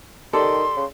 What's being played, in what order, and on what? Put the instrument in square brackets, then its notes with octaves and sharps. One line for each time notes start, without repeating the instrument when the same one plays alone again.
[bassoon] D#3 [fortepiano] G4 A4 D5 [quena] C6
[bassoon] C#3